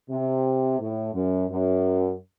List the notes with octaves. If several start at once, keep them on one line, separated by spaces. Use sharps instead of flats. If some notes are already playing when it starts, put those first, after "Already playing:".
C3
A2
F#2
F#2